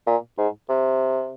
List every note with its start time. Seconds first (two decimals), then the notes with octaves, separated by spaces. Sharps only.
0.07 A#2
0.38 G#2
0.69 C3